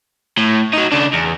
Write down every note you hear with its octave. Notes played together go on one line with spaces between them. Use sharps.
A2
F#3 D#4
C#3 D4
E2